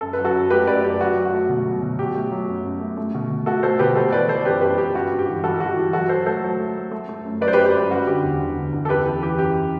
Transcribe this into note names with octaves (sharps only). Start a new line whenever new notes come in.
F#2 A4
B4
F#3
F#4 A4
F#2
A3 G4 B4
F#2 B4 D5
F#2 G4
F#3 F#4
F#3
F#4
A3
B2
F#3
B2
F#3 G4
A3
F#3
F#2
F#2
A3
A3
B2
B2
A3 F#4 A4
A3 A4 C5
B2 G4 B4
G3 A4 C5
E3 B4 D5
E3 A4 C5
F#2 G4 B4
F#2 G4 B4
F#2 G4
G3 F#4
G2
G4
E3
G3 F#4 A4
E3 F#4
G4
E3
F#3 F#4 A4
F#3 A4 C5
A3 A4 C5
F#3
A3
A3
A3
A3
F#2
F#3 B4 D5
C5
G4 B4
F#2
G4 B4
F#2
G3 F#4
D3 G4
E2
D3
D3
E2
A4
F#2 G4 B4
E3
E3 G4
F#2 G4